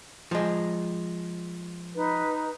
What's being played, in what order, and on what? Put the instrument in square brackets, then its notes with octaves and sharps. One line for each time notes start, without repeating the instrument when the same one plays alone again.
[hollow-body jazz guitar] F3 G#3
[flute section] D#4 B4